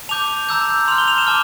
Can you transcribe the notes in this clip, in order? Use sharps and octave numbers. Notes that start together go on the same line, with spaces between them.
A5 D6 G6 F7
A#5 E6 G6
C6 F6 F7
G7
F7
E7
A5 D6 F6